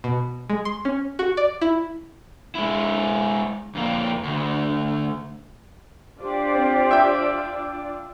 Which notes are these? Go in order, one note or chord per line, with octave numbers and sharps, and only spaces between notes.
B2
G#3
C6
C#4
F#4
D5
E4
G#3 E4
F2 A#3
D2
D4 F4 G4 C5 D5
C4
E5 G5